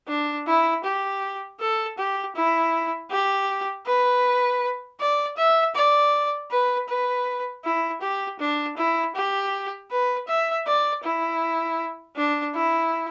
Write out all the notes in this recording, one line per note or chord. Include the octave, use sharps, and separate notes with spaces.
D4
E4
G4
A4
G4
E4
G4
B4
D5
E5
D5
B4
B4
E4
G4
D4
E4
G4
B4
E5
D5
E4
D4
E4